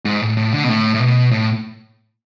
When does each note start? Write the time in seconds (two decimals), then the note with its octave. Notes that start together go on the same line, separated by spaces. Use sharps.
0.05 G#2
0.21 A2
0.37 A2
0.53 D3
0.64 B2
0.69 A2
0.94 A2
1.00 B2
1.31 A2